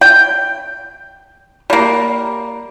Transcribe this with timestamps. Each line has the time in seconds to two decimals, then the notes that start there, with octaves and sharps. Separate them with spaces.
0.01 G5
1.70 G3 A#3